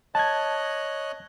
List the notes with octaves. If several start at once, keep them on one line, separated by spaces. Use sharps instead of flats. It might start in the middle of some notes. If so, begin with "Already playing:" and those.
C#5 D#5 A5 F#6 G#6